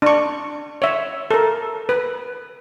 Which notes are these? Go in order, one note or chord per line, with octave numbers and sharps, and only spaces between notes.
D4 C#6
C#5 E5
A4 A#4
B4